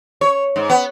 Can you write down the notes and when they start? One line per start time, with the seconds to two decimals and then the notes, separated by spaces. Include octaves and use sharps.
0.21 C#5
0.56 G#2
0.70 B3